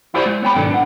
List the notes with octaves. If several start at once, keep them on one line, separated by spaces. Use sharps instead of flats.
E4 F4 G4 C5 D5
G#3
B3 C#5 G5 B5
B1 G#2 D#3 B3 D4 A4
D4 F#5